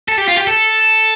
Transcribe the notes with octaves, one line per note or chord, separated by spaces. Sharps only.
A4
G4
F4
G4
A4